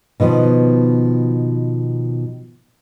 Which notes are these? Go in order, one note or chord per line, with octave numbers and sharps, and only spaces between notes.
B2 D#3 F3 B3